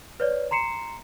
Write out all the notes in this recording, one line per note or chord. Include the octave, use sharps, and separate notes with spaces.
B4 C#5 D5
A#5 C6 C7 C#7 E7